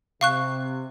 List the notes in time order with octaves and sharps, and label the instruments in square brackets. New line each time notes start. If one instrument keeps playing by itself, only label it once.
[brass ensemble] C3 [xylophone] F5 C#6 F#6